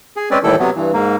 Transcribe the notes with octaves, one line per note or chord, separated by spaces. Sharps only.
G#4
G#3 C4 C#4 B4 D5
D#2 A2 E3 G3 E4 A4
C3 F#3 B3
G2 E3
G#2 A#3